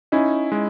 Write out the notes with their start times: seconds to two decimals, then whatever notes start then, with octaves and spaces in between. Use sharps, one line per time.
0.12 C#4 D#4 E4
0.52 G#3